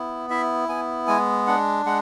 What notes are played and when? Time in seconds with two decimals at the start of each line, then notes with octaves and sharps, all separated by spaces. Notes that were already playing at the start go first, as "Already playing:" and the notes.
Already playing: B3 E4
0.30 E4 E5
0.69 B3 G#5
1.07 G#3 G#5
1.47 D4 F#5
1.86 G#3 F#5